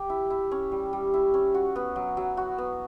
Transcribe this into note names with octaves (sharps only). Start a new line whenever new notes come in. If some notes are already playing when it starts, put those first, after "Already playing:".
Already playing: G4
E4
E4
C#4
G3
G3
E4
C#4
F#4
B3
F#3
F#3
F#4
B3